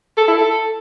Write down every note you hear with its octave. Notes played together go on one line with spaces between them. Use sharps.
A4
E4
A4